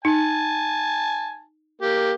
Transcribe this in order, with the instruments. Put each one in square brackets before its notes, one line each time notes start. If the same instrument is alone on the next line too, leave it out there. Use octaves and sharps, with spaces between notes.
[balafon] D#4 [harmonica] G#5 A5
[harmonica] A#3 G4